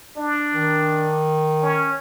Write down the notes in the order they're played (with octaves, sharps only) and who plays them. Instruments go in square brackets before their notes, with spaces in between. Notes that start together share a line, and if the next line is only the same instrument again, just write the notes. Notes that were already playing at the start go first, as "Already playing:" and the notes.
[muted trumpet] D4
[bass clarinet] D#3
[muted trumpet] C#4